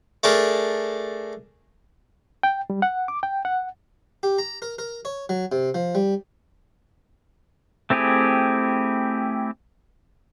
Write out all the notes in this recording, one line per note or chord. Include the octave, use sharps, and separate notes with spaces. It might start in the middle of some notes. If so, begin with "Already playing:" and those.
A3 D4 G#4 A#4
G5
G3
F#5
D6
G5
F#5
G4
A#5
A#4
A#4
C#5
F#3
C3
F3
G3
A3 C4 E4 G4 G#4